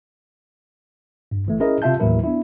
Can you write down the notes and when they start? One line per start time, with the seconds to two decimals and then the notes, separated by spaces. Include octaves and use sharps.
1.31 G2
1.46 G1 E3 A3
1.60 C#4 E4 G#4 A#4 D#5
1.82 C3 F4 E5 F5 A5 G6
2.00 D#2 A2 E3 F#3 E4 A#4
2.23 B3 D4 E4